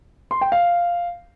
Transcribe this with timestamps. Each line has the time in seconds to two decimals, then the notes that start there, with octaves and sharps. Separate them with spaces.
0.31 C6
0.41 G5
0.52 F5